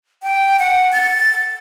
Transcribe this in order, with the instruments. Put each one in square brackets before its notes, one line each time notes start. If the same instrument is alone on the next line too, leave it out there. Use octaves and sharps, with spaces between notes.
[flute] G5
F#5
A6